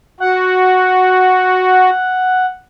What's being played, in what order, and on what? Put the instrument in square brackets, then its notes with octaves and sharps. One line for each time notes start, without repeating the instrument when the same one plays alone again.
[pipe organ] F#4 [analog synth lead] F#5